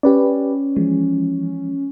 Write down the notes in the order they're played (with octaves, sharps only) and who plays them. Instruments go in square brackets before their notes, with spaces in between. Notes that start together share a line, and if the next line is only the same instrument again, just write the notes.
[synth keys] C#4 [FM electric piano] G4 B4 D5
[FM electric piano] E3 F3 G#3